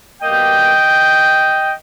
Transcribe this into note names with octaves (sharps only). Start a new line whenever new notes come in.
B2 G3 A#3 D#5 G5